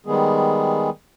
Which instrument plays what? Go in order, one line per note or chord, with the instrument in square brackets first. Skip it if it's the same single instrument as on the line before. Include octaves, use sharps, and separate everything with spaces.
[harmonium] D#3 G3 G#3 B3 G#4